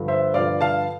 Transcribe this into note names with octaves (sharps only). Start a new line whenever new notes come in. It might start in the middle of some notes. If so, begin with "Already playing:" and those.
Already playing: G2 D3 F3
C5 E5
G2 D3 F3 D5 F5
F5 A5